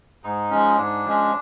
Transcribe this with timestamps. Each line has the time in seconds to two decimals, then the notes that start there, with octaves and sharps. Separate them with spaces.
0.23 G#2 D#4
0.50 F3 G#3 C#4
0.77 G#2 D4
1.04 F3 G#3 C#4